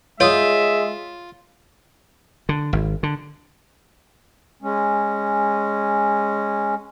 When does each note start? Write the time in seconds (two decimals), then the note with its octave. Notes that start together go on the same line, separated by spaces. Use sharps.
0.20 G#3 F4 C#5 E5 D#6
2.49 D3
2.73 G#1
3.03 D3
4.62 G#3 C#4